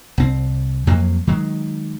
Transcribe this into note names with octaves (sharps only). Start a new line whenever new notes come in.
C2 C4
F2 F#3 A#3
D#3 F#3 G#3